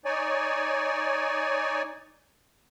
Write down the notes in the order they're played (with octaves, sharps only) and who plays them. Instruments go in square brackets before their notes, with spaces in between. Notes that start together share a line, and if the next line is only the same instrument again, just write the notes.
[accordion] D#4 C#5 D5 G#5